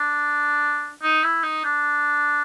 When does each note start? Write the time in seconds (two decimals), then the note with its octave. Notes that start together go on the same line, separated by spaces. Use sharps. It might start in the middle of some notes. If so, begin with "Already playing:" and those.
Already playing: D4
1.03 D#4
1.24 E4
1.43 D#4
1.65 D4